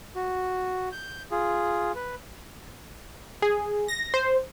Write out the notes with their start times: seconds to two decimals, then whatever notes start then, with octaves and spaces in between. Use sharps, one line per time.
0.15 F#4
0.92 G6
1.31 F4 G#4
1.95 B4
3.42 G#4
3.88 A#6
4.14 C5